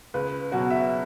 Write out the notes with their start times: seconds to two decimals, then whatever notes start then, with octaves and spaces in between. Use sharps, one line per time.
0.14 C#2 B4
0.52 B2 F#3 B3 F#4
0.71 E5